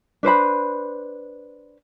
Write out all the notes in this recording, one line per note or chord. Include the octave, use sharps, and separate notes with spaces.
D4 B4 C5 B5